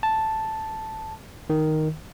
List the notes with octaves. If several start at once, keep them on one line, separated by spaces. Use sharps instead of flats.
A5
D#3